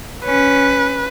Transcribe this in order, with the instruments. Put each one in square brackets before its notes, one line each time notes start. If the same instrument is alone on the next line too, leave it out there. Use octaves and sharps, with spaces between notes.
[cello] C#4 [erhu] B4